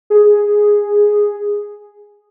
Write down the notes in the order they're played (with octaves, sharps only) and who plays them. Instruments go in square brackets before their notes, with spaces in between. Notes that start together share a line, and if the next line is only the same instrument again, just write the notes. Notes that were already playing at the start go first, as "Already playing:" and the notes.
[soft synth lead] G#4